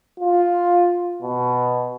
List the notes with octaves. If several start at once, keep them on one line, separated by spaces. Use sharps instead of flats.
F4
B2